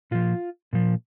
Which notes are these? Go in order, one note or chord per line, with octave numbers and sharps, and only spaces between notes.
A#2 F3 F4
A#2 F3